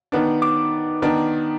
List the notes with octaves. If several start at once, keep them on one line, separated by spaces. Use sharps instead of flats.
D#3 B3 D4
D6
D#3 B3 D4